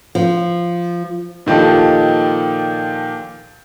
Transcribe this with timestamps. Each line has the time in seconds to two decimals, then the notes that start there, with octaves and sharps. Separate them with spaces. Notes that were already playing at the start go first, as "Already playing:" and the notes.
0.15 F3
1.46 A#2 D#3 F3 G4 A4